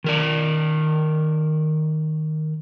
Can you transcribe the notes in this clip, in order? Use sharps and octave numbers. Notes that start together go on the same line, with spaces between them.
D#3 A#4 D5